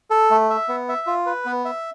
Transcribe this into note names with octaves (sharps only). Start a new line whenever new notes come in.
A4
A3
E5
B3
E5
F4
B4
B3
E5